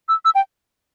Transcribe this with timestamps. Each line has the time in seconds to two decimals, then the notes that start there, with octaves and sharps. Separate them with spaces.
0.09 E6
0.25 E6
0.35 G5